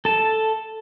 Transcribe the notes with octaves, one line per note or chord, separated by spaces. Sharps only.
A4 A5